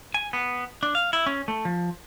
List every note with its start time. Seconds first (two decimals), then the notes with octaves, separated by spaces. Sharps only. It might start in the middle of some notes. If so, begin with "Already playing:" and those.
0.14 G#5
0.33 B3
0.83 D4
0.95 F5
1.13 E4
1.26 C#4
1.48 A3
1.65 F3